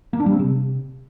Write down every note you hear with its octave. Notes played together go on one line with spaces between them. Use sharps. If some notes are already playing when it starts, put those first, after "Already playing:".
A#3
D4
G3
C4
C3